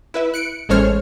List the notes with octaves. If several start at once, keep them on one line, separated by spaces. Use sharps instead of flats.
E4 B4 E5
F#6 C#7 D7
A1 G#3 A4 C5 C#5 F6